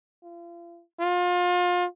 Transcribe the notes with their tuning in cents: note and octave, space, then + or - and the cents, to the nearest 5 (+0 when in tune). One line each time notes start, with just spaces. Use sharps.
F4 -40
F4 +30